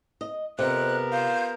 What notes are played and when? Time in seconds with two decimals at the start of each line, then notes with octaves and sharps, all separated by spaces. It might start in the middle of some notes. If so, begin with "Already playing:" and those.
0.21 D#5
0.59 F2 C3 B3 A#4 F#6
1.12 F4 G6